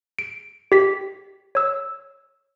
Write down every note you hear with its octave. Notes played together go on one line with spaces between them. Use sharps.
D7
G4 B6
C#5 E6